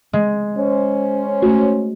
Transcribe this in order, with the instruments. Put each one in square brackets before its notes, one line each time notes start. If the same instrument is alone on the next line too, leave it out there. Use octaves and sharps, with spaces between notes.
[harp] G#3
[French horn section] C#4 C5
[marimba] A3 F#4